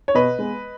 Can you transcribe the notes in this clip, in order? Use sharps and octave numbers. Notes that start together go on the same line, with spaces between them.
C#5
B2 B4 D#5
G#3 B3